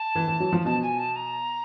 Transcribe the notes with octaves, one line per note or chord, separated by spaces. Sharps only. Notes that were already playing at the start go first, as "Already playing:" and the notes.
Already playing: A5
E3
E3
F#3
F3
B2 A5
G#5
A5
A#5